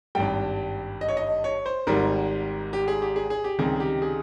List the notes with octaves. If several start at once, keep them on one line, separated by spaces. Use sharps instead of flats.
G#1 G2 G3 G5
D#5
C#5
D#5
C#5
C5
G#1 G#2 G3 A#4
G4
G#4
G4
G#4
G#4
G4
C#2 C3 D#3 G3 G#4
G#4
G4
G#4